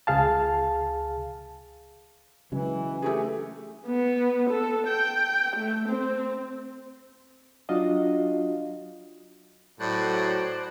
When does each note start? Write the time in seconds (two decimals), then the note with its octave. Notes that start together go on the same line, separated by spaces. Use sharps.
0.07 C#2 G#4 F5 A5
2.52 C#3 E3 F#3 G#3
3.02 A3 G4 G#4
3.86 B3
4.50 A4
4.87 G5
5.57 A3
5.89 C4
7.69 F#3 D4 F4 F#4 D#5 F5
9.80 A2 F#3 C5 D5 F#6